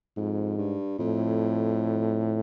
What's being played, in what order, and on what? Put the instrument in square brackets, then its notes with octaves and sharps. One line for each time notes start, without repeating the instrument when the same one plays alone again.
[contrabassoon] F2 [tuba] G#2
[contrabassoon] G2
[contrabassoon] F2 [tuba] A2